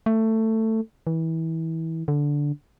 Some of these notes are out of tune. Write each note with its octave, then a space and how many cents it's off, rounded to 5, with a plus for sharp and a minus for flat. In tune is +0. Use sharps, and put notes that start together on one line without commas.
A3 +15
E3 -25
D3 -10